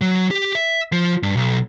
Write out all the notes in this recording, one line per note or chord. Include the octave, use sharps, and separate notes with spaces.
F#3
G4
E5
F3
G2
B1